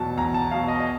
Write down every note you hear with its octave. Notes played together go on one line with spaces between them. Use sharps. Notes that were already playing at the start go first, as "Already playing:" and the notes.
Already playing: E2 B2 F#3 A5
E2 A#5
A5
B2 F#3 F5
D#5
D#5